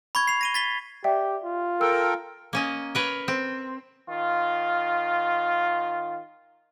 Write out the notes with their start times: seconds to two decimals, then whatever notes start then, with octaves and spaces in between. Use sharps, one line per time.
0.15 B5 C#6 G#6
0.28 C7 F7
0.41 A#6 D#7 G7
0.54 A6 B6 G7
1.04 G4 D5 E5 G5
1.44 F4
1.81 A4 A#4 G5 E6
2.53 A#3 C#4 D#5
2.95 A#4 B4 C#5
3.28 C4
4.09 D#3 F4